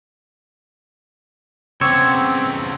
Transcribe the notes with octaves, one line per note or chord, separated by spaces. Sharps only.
C#3 B3 C4 C#5 C#6 D6 E6